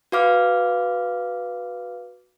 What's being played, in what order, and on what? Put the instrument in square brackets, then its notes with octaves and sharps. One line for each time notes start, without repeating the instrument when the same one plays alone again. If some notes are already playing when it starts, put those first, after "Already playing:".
[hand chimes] F#4 B4 F5 D6 F6